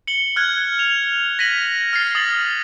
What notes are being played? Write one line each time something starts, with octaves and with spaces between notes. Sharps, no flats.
C#7 F#7 G7
F6 F#6 G#6
F7
A#6 B6 D#7 F#7
F6 A6 C7
D#6 A6 F#7